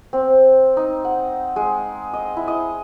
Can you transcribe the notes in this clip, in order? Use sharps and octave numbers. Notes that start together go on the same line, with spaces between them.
C4
D#4
F#5
G#3
D#5
E4
D#5